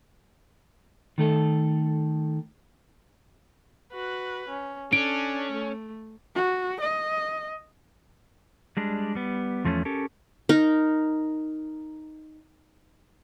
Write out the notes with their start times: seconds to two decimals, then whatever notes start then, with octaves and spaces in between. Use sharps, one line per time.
1.18 D#3 A3 A4
3.92 F#4 B4
4.49 C#4
4.93 C#4 D4 A4 D7
5.52 A3
6.35 F#4
6.81 D#5
8.77 G3 G#3 D4
9.15 G3 B3
9.65 E2 F3 A3 B3 C#4
9.85 C#4 G4 A4 A#4
10.49 D#4 A#4